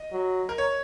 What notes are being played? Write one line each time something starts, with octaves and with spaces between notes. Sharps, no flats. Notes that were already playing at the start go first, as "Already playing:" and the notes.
Already playing: D#5
F#3
A#4
C#5